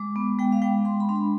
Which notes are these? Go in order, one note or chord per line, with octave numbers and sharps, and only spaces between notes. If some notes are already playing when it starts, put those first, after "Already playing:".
Already playing: G#3 D6
B3
G#3 G5
F5
G#3 G5
G#3 C6
B5
D4
B5